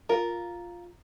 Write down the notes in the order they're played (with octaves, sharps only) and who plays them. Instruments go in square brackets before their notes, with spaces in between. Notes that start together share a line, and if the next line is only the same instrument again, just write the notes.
[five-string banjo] F4 A#4